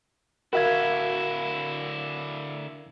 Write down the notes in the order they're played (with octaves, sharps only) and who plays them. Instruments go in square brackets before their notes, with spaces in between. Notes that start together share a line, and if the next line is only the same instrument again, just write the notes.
[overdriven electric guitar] D3 E4 [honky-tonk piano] F#4 E5 [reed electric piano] A#4 F5 G#6